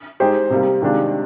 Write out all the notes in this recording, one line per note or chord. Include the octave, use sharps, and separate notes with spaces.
G#3 D#4 G4 C5
C3 G3 A#3
C3 D#3 G#3 D4 F4